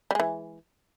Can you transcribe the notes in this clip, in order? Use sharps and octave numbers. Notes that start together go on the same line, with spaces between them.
E3 G3 G#3